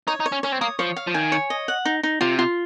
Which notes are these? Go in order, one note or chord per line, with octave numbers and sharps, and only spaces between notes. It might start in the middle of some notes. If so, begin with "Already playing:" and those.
D#4 C#5
D#4
C#5
C#4
C#4 C#5
C4
A#3 D#6
F3 C#5
F5
F3
D#3 G#5
C#5
D#5
F#5
D#4
D#4
C3 F4
F4